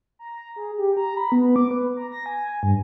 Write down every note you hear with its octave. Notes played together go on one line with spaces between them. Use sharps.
A#5
G#4
G4
A#5
B5
B3
D6
B4
A#5
A#6
G#5
G2